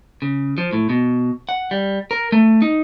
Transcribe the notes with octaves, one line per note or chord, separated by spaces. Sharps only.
C#3
F3
A2
B2
F#5
G3
A#4
A3
D#4